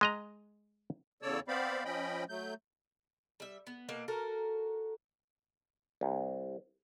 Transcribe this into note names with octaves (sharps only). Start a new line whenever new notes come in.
G#3 D#5 A#5
E2 C#3 A4 C#5 D5 E6
B3 C4 C5 D5 F5 B5
F3 C#4 D#5 G5 B5
F#3 A3 G6
G3 E5
B3
B2 A#3 F5 F#5
F#4 A4 A#4
C2